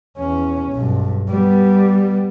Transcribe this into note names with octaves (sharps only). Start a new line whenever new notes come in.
E2 C#4
B1 G2
G3 B3